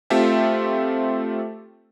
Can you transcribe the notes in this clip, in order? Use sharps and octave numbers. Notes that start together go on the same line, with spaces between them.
A3 C4 F4 G4 A4 E5